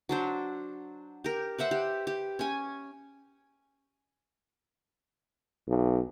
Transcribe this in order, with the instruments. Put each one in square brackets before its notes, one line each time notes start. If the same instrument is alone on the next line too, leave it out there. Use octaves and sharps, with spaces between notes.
[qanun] F#3 D4 C5
G4 A#4
B4 C5 E5 F#5
G4
G4
C#4 G#5
[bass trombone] B1